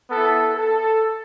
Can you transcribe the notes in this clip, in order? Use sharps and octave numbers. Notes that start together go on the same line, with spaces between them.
B3 E4 A4
A4